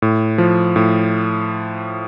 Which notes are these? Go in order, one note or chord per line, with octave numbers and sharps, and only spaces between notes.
A2
F3
A2